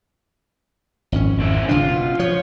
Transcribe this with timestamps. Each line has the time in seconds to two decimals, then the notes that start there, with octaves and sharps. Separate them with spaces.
1.12 G#1 F2 C#4
1.40 G#3 C4 E4
1.69 G1 C#3 D4 F4
1.88 B2
2.20 F3 C#5